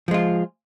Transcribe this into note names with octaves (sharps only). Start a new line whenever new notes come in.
F3 G#3 F4